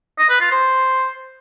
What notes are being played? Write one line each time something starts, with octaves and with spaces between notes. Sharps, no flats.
D#5
B4
F4
C5